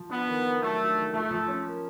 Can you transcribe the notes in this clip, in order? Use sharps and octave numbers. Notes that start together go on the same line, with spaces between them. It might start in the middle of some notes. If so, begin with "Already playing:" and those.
Already playing: F3
B3 D4
D#3
A#3
F#3 A3
D4
D#3
F3 A3
F3
C#4
A#3